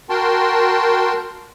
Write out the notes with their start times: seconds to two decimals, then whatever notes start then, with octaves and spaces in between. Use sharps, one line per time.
0.10 F#4 A#4 G5 A5 C6